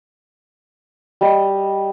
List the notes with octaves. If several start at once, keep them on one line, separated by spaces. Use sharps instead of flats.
G3 D#5